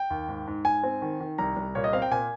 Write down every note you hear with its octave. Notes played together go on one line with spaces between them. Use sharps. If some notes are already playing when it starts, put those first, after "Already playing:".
Already playing: G5
D#2
G#2
G#2
G#2 G#5
C4
D#3
D#3
C2 A#5
C2
A#2 C#5
D#5
C4 F5
G5
A#2 G#5